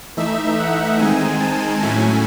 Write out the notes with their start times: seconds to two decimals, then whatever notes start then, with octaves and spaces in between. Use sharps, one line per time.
0.17 E3 A3 D#4 E5
0.59 F#5
0.99 D#3 G#3 C4 D#4 G#5
1.40 A5
1.82 A2 F#3 A3 C#4 E4 G#5